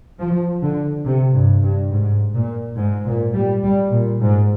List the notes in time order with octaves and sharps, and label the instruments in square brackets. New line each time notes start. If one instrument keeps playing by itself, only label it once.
[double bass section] F3
D3
C3
G2
G2
G#2
A#2
G#2
A#2
G3
G3
A#2
G#2